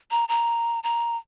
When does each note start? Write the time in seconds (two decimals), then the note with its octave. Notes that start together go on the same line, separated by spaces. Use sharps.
0.11 A#5
0.29 A#5
0.84 A#5